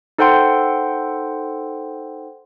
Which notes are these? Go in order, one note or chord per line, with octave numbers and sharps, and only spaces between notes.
D#4 A4 C5 F#5 G5 C6